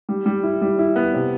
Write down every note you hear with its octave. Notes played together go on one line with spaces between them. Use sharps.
G3
G3
E4
G3
E4
B3
C3